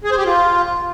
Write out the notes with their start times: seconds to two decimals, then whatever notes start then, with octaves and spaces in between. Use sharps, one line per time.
0.04 G#4
0.11 C5
0.18 G4
0.25 F4